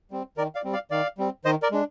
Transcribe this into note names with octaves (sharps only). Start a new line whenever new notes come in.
G3 C4
D#3 A#4 D5
D5 F5
G3 C4
D5 F5
D#3 D5 F5
G3 C4
D#3 C5 D#5
A#4 D5
G#3 D4